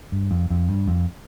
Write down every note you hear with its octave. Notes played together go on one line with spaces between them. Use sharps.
G2
F2
F2
G2
F2